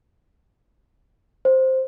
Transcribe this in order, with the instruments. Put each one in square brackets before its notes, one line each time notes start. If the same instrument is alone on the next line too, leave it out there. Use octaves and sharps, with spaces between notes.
[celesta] C5